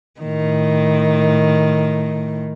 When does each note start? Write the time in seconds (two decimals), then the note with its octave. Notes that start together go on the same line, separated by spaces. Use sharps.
0.21 A2 D#3